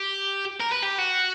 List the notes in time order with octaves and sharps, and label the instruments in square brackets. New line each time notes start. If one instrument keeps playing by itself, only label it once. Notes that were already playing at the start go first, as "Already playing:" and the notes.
Already playing: [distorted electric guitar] G4
A#4
B4
G4
F#4